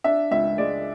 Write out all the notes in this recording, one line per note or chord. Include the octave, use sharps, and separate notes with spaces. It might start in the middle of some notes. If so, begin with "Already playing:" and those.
D4 E5
C#2 E5
G#3 D5